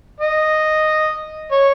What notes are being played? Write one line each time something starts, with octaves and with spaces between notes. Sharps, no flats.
D#5
C#5